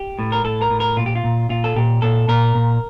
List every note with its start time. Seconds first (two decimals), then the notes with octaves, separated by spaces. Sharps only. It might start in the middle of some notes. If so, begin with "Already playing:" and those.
Already playing: G4
0.19 A2
0.32 A#4
0.44 A2 A4
0.62 A#4
0.70 A2
0.80 A#4
0.97 A#2 F4
1.06 G4
1.15 F4
1.24 A#2
1.49 A#2 F4
1.64 A4
1.76 A#2 G4
2.02 A#2 A4
2.28 A#2 A#4
2.55 A#2